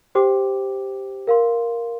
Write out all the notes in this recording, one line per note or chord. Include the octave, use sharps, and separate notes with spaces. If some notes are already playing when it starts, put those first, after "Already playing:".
G4 C5 G5 D6
A#4 F5 C6